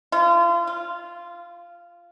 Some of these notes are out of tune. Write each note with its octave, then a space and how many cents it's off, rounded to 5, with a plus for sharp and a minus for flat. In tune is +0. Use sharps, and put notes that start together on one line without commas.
F4 -35
F4 -10